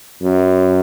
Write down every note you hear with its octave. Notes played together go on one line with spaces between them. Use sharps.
F#2